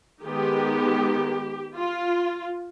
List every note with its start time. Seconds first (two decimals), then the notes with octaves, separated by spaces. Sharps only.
0.22 D#3 G#3 B3 G4
1.75 F4